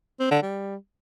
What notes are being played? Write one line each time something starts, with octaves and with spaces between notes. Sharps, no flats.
C4
D3
G3